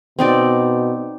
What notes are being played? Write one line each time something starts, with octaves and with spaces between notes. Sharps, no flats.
B2 C4 D#4 D5